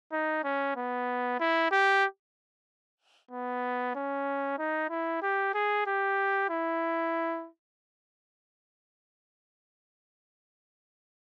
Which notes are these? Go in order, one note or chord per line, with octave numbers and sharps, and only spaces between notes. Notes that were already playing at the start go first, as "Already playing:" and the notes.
D#4
C#4
B3
E4
G4
B3
C#4
D#4
E4
G4
G#4
G4
E4